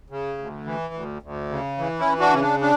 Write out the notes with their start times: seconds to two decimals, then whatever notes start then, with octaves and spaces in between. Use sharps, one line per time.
0.10 C#3
0.38 D2
0.65 E3
0.94 D2
1.22 D2
1.49 C#3
1.78 E3
1.99 C#4 E4
2.05 E3
2.19 D4 F#4
2.33 C#3 C#4
2.41 D4
2.61 D4